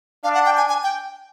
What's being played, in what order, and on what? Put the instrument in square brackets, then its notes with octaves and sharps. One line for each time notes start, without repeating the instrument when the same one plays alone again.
[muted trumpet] D4 [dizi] F5
[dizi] F#5
G5
G#5
G#5
G5